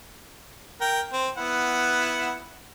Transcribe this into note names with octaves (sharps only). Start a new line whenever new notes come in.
A#4 G5
C4
B3 E4 F#5